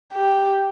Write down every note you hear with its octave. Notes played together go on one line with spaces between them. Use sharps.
G4